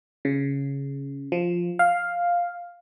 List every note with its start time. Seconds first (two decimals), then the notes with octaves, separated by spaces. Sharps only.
0.25 C#3
1.32 F3
1.79 F5